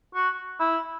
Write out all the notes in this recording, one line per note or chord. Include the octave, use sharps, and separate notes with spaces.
F#4
E4